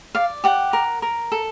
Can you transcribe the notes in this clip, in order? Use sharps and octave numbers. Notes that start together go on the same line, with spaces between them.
D5 F5
G4 F#5
A#4
A#4
A4